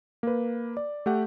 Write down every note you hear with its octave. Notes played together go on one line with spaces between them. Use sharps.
A#3 B4
D5
A3 G4 F#5